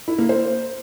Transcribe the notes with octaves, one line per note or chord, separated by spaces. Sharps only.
E4
A#3
C5